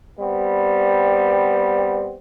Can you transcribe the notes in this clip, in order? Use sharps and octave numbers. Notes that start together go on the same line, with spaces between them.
G3 B3 C4